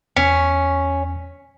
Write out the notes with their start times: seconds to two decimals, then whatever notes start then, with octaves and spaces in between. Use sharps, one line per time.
0.16 E2 C#4 B6